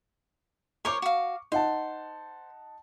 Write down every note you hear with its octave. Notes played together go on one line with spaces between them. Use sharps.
A#4 C5 C#5 C#6 D6
F#4 F5
D#4 C5 F#5 A5